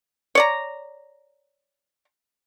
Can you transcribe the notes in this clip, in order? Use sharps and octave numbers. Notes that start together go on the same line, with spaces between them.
C#5 D5 A#5